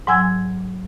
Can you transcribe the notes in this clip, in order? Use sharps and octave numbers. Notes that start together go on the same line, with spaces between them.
G#2 F#3 G#5 E6 G#6